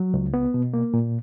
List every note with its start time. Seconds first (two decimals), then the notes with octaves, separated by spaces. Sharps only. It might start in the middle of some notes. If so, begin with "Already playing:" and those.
Already playing: F#3
0.14 C#2
0.34 B3
0.54 B2
0.74 A#3
0.94 A#2